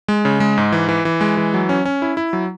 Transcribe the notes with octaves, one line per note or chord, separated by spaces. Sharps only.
G#3
C#3
G#3
G#2
E3
E3
E3
G#3
E3
F#3
C#4
C#4
E4
E4
F#3